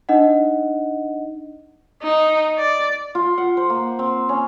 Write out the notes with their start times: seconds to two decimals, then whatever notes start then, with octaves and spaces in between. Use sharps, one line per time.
0.09 D4 D#4 D#5 F#5
2.02 D#4
2.58 D5
3.15 F4
3.38 F#5
3.57 C5
3.70 A#3
3.99 C4
4.29 C#4